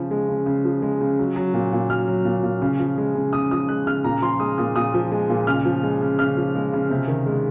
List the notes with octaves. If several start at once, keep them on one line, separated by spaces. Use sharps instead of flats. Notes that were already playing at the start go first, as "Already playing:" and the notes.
Already playing: C#3 F3
G#3
C#3
C#3
F3
G#3
C#3
F#3
F#3
A#2
A#2
F#3 F6
F#3
A#2
A#2
C#3
F3
G#3
C#3
C#3 D#6
F3 D#6
G#3 F#6
C#3 F6
A#2 A#5
F3 C6
G#3 D#6
A#2 D#6
A#2 D#6
F3
G#3
A#2
C#3 F6
F3
G#3
C#3
C#3 F6
F3
G#3
C#3
C3
D#3
G#3